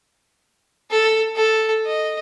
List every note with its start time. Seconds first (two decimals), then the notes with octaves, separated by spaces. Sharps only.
0.91 A4
1.36 A4
1.86 D#5